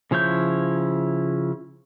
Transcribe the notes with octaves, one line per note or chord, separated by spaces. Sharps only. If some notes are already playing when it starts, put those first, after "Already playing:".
C#3 F3 E4 C#5 G6